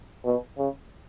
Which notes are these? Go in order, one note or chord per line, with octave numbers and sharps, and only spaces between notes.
B2
C#3